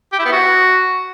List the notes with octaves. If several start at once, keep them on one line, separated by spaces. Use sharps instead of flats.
G4
E4
B3
F#4